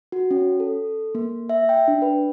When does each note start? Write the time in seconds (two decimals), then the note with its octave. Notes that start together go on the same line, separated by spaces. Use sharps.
0.12 F#4
0.31 C#4
0.60 A4
1.15 A#3
1.50 E5
1.69 G5
1.88 D4
2.02 B4